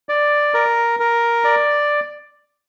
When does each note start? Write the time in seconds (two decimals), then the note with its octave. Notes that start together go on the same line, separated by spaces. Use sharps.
0.09 D5
0.54 A#4
1.00 A#4
1.44 D5